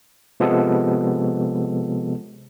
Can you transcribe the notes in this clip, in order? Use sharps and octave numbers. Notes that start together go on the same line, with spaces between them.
C3 F3 G#3 B3 A4